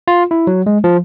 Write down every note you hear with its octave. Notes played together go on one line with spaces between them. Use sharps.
F4
E4
F#3
G#3
F3